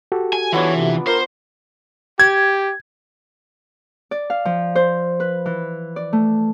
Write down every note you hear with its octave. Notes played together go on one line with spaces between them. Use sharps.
F#4 G4 A4
G#5
E3 F3 B3 D4 C#5
C3
F4 A#4 C5
G4 G#6
D5
F5
F3
C5
B4
E3
D5
A3